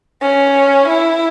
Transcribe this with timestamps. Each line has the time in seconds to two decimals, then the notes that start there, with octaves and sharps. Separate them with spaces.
0.22 C#4
0.88 E4